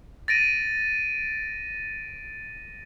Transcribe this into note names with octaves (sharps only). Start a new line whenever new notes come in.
A6 A#6 D7 D#7